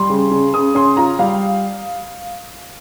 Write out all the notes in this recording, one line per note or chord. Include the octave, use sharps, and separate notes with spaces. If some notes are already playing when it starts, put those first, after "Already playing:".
Already playing: G3 C6
C#3
C#3
C#3 D#6
C#4 C6
F4 A#5
G3 F5